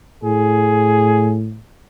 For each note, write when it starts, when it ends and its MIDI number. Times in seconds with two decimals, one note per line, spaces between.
0.23 1.59 45
0.23 1.36 68